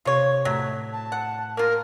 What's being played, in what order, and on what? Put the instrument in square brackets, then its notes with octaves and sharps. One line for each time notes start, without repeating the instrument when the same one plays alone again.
[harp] C3 [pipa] F4 C#5
[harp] A2 A3 B6 [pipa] F#3
[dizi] A5
[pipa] F#5 [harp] F#6
[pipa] A#3 F4 [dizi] A#4